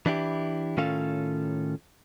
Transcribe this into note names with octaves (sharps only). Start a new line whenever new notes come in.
E3 D4 E4 G4
A2 D#3 C#4 F4 A4 F5